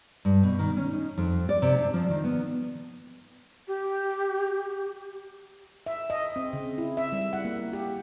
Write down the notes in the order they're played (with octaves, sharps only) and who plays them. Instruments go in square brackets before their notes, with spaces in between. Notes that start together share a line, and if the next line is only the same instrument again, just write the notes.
[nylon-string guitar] G2
B2
D#3
C#4
D#4
F2
D5
C3
D4
F3
D#3
B3
[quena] G4
[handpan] E5
D#5
C4
C#3
E4
E5
G3
F#5
A#3
G4